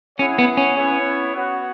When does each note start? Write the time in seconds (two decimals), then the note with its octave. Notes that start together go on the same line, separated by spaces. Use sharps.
0.19 C#4 E4 G#4 C#5 F#5
0.39 B3
0.57 C#4
0.76 B3 E4 C#5
1.34 B3 F#4 C#5 F#5